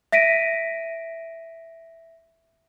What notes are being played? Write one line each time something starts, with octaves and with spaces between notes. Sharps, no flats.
E5 A#6 B6 D7 D#7